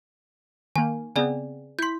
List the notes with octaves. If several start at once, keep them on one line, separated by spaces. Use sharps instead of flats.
D#3 A#3 G#5
C#3 B3 C4 G#4 D5 G#5
E4 C6 G6 B6